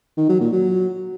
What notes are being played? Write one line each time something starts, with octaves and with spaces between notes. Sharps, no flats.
D#3
F#3
A#2
F#3